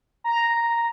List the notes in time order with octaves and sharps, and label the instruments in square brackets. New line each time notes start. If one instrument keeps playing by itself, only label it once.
[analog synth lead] A#5